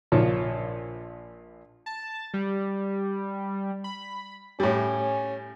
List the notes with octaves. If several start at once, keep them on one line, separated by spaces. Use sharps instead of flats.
A#1 F3 C#5
A5
G3
B5
A2 G3 C#4